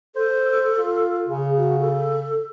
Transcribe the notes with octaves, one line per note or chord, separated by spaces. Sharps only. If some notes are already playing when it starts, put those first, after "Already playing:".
A4 C5
F4
C#3 G#4
F#4
A4